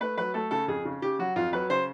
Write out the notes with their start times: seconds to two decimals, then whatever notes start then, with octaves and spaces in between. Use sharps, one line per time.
0.01 A3 B4
0.17 F#3 B4
0.34 A3 A4
0.51 C#3 A4
0.68 F2 G#4
0.85 C#3
1.02 C#3 G4
1.19 F#3 F#4
1.36 F2 F4
1.53 F#3 B4
1.70 C#3 C5